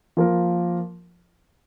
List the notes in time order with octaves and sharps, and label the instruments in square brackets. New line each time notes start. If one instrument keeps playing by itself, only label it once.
[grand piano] F3 A#3 F4 A#4